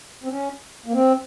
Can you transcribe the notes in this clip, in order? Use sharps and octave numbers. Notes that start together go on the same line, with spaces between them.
C4
C#4
A#3
C4